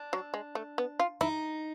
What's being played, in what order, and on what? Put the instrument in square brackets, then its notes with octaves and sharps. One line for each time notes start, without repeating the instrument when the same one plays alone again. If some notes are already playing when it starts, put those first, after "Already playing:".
Already playing: [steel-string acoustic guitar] D4
[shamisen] F#3
G#3
A3
B3
F4
[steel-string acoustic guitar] D#4 [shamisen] E4